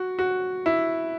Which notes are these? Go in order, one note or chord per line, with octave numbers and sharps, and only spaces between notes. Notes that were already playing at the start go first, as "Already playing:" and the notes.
Already playing: F#4
F#4
E4